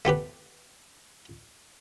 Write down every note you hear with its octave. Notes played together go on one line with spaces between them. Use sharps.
A3 B3 G4 B4